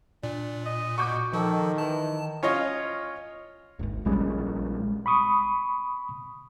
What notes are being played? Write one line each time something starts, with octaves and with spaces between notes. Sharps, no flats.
A#2 D4
D#5
F#4 C#6 D6 G6
D#3 F3 A4
E3 A5
C#4 F4 C#5 D#5
D1 G#1
A#1 G3 G#3 C#4
B5 C#6 D#6